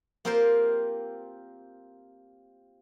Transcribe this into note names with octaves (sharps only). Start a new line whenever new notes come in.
A#3 C4 F4 G4 A#4 C5